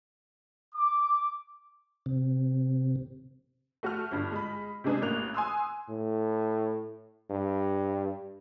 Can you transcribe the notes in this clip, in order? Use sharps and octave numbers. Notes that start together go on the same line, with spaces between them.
D6
C3
A3 F#4 A4 F6
G1 G2
G#3 B5
C3 G#3 C#4 D4 G#4 B4
A1 A#3 F#6 F7
G#5 C6 D#6 E6
A2
G2